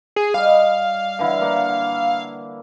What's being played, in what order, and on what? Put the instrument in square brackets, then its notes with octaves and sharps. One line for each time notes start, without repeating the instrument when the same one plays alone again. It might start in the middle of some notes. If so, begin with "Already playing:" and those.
[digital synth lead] G#4
[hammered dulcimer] G3 D#5 [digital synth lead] F5
[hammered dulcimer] D3 E3 E4
A#3 F#5